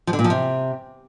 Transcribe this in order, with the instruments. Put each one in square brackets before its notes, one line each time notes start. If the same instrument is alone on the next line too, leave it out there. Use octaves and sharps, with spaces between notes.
[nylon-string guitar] F3
D3
A#2
F3
C3